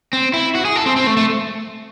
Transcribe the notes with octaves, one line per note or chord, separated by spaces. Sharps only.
C4
E4
F#4
G#4
A4
C4
C4
A3
A3